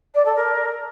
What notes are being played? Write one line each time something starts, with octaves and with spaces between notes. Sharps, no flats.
D5
A4
A#4